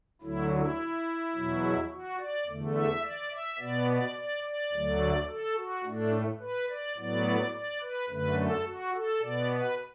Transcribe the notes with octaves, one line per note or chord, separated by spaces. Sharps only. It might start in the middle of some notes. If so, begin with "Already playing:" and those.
D2 D3 F#3 E4
E4
E2 B2 F#3
F#4
D5
E2 D3 A3
E5
D5
E5
B2 B3 D5
D5
D5
D5
D2 D3 F#3 A3
A4
F#4
A2 A3 D4
B4
D5
A2 F#3 B3 D5
D5
B4
F#2 D3 A3 B4
A4
F#4
A4
B2 B3 D5
B4